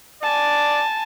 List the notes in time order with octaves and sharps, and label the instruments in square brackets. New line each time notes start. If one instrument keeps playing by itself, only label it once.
[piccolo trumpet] D5 [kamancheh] G#5 A5